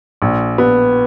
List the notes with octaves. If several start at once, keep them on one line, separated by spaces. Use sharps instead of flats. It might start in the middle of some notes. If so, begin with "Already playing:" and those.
A#1
B3